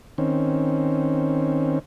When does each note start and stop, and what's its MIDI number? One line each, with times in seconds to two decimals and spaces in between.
0.18 1.79 51
0.18 1.79 60
0.18 1.79 61